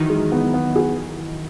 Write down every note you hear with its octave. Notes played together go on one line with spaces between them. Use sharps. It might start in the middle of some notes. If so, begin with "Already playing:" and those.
Already playing: D#3 E3 F#3 D#4 E4 F#4
G#3
B3
B3
G#4